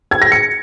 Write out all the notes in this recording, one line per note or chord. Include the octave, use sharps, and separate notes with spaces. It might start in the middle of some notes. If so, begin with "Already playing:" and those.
G#6
A#6
C#7